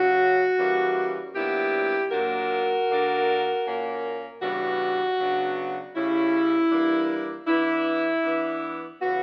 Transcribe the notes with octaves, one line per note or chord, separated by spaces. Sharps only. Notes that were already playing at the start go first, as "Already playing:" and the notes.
Already playing: C#3 F#3 C#4 F#4
E3 G3 A#3 C#4
A#2 F#3 B3 D4 E4 G4
A#2 F#3 A#3 D4 F#4 A#4
D3 A#3 D4
A#2 A#3 C#4
C#3 E3 G3 B3 D4 F#4
C#3 F#3 B3 D4
C#3 G3 C#4 E4
E3 G3 A#3 D4
E3 B3 D4 E4
E3 B3 D4
C#3 E3 B3 F#4